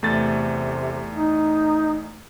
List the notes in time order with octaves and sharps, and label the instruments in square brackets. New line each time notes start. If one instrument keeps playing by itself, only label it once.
[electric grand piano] E2 A3 A6 [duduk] C3
[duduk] D#4